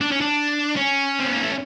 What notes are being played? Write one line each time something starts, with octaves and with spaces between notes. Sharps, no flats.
D4
C#4
D4
C#4
C4
B3
A#3
A3